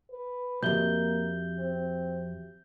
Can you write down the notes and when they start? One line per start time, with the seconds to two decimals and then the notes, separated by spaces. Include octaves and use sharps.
0.10 B4
0.63 B1 F2 A#3 F#4 G4 E5 G6 G7
1.58 C4